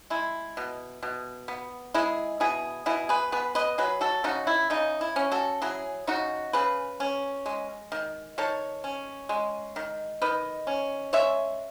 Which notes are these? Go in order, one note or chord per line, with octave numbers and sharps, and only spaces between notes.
G#3 E4
B2
B2
B3
G#3 E4 G#4
B2 E4 G#4
B2 E4 G#4
G#4 B4
B3 G#4 B4
B4 D#5
F#3 G#4 B4
F#4 A4
C#3 D#4 F#4
E4
C#3 D#4
E4
C#4
F#4 A4
F#3 E4 G#4
C#3 D#4 F#4
C#3 G#4 B4
C#4
G#3
D#3
D#3 A4 C#5
C#4
G#3
D#3
D#3 B4 D#5
C#4
G#3 C#5 E5